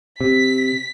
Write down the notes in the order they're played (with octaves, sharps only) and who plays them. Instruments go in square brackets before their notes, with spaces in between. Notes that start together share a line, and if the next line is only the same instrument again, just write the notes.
[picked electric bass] C3 [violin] B6